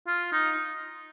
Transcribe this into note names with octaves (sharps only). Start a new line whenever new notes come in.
F4
D#4